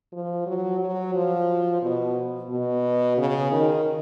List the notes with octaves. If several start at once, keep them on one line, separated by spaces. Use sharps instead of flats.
F3
F#3
F#3
F3
B2
B2
C#3
D#3